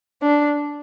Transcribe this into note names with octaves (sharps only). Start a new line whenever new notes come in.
D4